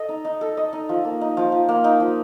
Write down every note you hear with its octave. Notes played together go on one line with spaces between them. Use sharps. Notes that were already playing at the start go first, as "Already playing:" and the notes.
Already playing: A4 D#5
D#4
D#4
A4
D#5
D#4
F3
A#3
D#4
F3
F3
A#3
D#4
F3